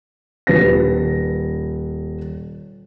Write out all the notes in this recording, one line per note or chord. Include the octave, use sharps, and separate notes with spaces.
D#1 B4 A#6